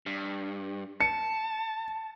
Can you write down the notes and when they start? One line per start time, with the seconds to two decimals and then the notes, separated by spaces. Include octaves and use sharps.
0.06 G2
1.01 A5 C#7